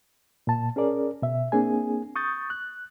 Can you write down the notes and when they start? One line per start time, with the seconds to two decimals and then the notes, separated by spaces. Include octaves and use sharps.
0.47 A#2 A5
0.76 C#4 G#4 A#4 D5
1.22 B2 E5
1.52 A#3 C4 D4 G#4 G#5
2.16 C#6 D#6 G6 A6
2.50 F#6